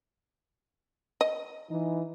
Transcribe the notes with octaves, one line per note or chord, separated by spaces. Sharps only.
D#5
E3 D#4